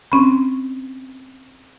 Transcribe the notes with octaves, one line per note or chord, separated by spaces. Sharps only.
C4 C#4 B5